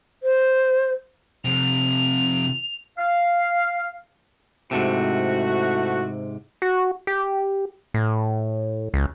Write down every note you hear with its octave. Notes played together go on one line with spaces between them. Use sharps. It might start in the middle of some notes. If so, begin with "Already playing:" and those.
C5
F2 C3 F7
F5
G#2 C3 A3 E4 F#4
F#4
G4
A2
C#2